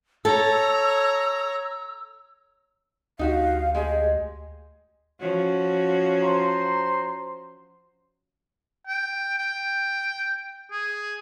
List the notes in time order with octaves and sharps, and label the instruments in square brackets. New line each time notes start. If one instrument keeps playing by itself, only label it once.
[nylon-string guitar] A4 [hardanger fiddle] C#5 A#5 [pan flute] E6
[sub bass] D2 [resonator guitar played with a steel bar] D#4 F#4 G4 [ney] F5
[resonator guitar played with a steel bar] G#3 G4 G#4 [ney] D#5
[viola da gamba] F3 C#4 F#4
[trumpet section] C5 A#5 C6
[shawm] G5
G5
G#4